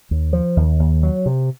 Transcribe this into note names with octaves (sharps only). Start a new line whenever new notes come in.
D#2
F3
D#2
D#2
F#3
C3